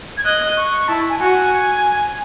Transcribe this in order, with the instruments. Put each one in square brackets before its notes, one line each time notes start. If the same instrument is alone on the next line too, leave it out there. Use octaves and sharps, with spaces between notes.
[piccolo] G#6
[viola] D#5 [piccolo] F#6
[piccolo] C#6
[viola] E4 [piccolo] A5
[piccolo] G#5
[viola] F#4 [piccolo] G#5